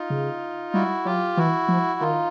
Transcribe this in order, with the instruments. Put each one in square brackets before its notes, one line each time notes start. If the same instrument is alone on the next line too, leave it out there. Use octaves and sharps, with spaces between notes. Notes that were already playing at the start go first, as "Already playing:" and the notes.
Already playing: [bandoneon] D#4 F4
[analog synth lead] C#3
[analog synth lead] G3 [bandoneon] E4 F#4
[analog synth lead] F#3 [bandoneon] F4 G4
[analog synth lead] E3 [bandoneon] E4 F#4
[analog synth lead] F3
[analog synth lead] D#3 [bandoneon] D#4 F4